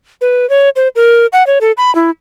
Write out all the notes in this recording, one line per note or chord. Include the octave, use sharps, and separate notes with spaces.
B4
C#5
C5
A#4
F#5
C#5
A4
B5
E4